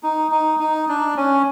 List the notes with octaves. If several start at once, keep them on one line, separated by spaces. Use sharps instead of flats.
D#4
D#4
D#4
D4
C#4